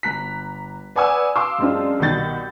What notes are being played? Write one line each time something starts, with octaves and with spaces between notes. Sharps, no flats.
G1 A#5 F#6 B6
B4 D5 F#5 G#5 D#6 E6
F5 C6 D6 E6
F#2 G#3 C4 D4 F4
C2 B2 D#3 G6 A6